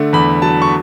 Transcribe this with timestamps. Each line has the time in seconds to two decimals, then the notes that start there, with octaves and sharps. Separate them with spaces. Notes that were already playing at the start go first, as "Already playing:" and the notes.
Already playing: D3 A3
0.13 E2 B5
0.42 F#3 A5
0.62 C#6